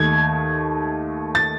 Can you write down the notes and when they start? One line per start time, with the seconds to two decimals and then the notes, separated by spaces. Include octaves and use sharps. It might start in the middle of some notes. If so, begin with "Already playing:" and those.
Already playing: D#2 D#3 A3 G#6
1.35 A6